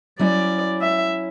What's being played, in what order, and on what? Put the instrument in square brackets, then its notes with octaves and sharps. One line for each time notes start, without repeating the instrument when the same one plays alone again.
[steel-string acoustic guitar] F#3 C#4 E4 [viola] D5
[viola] E5